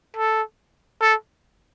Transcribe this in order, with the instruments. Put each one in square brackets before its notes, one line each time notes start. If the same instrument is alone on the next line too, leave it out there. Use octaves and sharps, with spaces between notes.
[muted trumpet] A4
A4